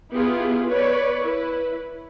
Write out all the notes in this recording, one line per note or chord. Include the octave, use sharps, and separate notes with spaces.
B3 E4 F4 G4 G#4
B4 C#5 D5
E4 B4